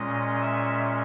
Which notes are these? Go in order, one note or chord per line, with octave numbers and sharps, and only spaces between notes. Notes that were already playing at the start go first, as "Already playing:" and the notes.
Already playing: A#2 G#3 C#4 D#5
E5